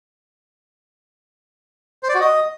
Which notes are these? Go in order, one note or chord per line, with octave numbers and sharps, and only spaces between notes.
C5
D5
F#4
D#5